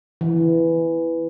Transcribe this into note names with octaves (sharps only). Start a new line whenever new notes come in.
E3